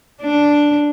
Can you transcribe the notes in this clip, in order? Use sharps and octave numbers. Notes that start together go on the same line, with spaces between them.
D4